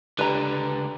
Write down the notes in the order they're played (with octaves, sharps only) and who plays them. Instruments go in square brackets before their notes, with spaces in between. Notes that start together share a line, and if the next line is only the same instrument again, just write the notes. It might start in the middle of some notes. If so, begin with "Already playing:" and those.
[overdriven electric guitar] C#2 D3 [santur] G3 [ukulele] B4 A#5